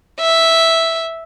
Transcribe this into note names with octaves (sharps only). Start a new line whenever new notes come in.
E5